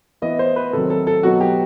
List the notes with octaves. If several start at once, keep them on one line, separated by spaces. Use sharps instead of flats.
E3 B3 E4 D#5
C5
B4
C3 D#3 F#3 A4
A4
A4
B2 F#3 B3 D#4 F#4
G4